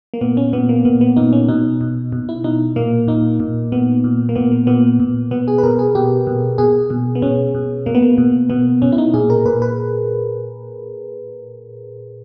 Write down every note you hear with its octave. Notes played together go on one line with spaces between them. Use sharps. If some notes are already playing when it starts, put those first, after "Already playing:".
A#3
A#2 B3
C#4
A#2 B3
A#3
A#2 B3
B3
A#2 D#4
C#4
B2 D#4
B2
B2
E4
B2 D#4
A#2 A#3
A#2 D#4
A#2
A#2 B3
A#2
A#3
A#2 B3
A#3
A#2 B3
A#2
B2 B3
G#4
B4
B2 A#4
G#4
B2 G4
B2
B2 G#4
B2
B3
B2 C#4
B2
B2 A#3
B3
A#3
B2
B2 B3
B2 C#4
E4
D#4
A#2 G#4
A#4
A#2 B4
B4